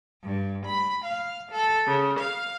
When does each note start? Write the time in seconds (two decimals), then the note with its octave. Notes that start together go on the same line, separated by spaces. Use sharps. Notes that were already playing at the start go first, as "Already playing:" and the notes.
0.22 G2
0.66 B5
1.04 F5
1.51 A4
1.87 C#3
2.19 F5